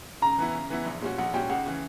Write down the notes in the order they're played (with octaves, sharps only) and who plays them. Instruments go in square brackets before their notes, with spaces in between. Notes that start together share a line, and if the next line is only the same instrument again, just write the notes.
[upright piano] C#3 [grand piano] A#5
[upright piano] E3 B3 E4
C#3
E3 B3 E4
A#1
A#2 G3 C#4 F#4
[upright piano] A#1 [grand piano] F#5
[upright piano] A#2 G3 C#4 F#4 [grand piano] G5
[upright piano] C#2 [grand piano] F#5
[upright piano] C#3 E3